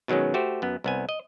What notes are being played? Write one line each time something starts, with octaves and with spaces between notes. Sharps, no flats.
B2 D#3 F#3 G#3 C#4
A3 F#4 G4 C5
F#2 B3
C2 B3 G#5
D#5